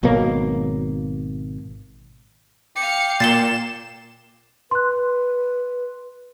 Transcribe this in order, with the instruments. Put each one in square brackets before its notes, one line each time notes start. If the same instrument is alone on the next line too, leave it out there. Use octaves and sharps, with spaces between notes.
[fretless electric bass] G#1 B2 F#3 A#3
[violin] F5 C#7 [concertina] G5 D6
[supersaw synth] A#2 [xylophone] A6 C7 G7 [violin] E7
[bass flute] B4 [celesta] C6 F#6